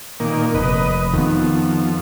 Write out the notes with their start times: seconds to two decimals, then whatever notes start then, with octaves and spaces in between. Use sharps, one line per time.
0.20 A#2 D#3 A#3
0.55 F1 B4 D#5
1.14 F2 D#3 B3